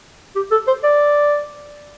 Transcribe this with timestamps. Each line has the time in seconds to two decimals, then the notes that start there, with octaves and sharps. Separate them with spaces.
0.36 G4
0.51 A4
0.67 C5
0.84 D5